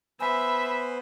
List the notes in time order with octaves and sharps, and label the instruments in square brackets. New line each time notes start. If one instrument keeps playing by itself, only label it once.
[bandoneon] B3 B4 C5 [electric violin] E5 [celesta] G#5 [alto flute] B5